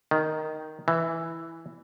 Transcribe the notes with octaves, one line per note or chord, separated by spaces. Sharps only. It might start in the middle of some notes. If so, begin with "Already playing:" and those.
D#3
E3